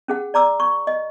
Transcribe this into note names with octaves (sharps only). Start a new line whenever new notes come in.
C#4 G#4 F#5
D5 A#5 D6 E6
C#6
D#5